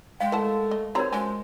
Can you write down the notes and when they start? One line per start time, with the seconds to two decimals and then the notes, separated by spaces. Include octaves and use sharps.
0.21 G#3 F5 G5
0.32 A3 E4 A#4 F#5 A5
0.71 D#5
0.95 C4 F#4 G4 A#4 C5 C#5 A#5
1.13 F3 G#3 C#4 G#5